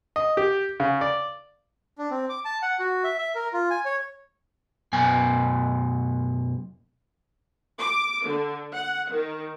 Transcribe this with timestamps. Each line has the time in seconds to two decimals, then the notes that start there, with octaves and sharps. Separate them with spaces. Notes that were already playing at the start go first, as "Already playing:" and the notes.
0.16 D#5
0.37 G4
0.80 C#3
1.01 D5
1.98 D4
2.11 C4
2.29 D6
2.45 A5
2.62 F#5
2.79 F#4
3.04 E5
3.18 E5
3.35 A#4
3.53 F4
3.70 G#5
3.85 C#5
4.93 F#2 B2 G#5
7.80 D6
8.25 D3
8.73 F#5
9.10 D#3